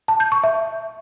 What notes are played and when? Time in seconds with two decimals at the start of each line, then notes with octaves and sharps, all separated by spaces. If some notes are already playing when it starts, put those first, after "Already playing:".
0.08 A5
0.20 G6
0.32 C#6
0.44 E5